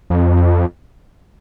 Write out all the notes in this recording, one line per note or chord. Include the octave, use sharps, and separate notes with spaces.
F2